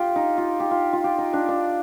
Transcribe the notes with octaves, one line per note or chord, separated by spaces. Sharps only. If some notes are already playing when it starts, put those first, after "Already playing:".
Already playing: F4 G4
D#4
F4
G4
F4
F4
G4
D#4
D4
D4